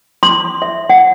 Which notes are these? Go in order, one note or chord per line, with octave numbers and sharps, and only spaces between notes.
C6
E5
F#5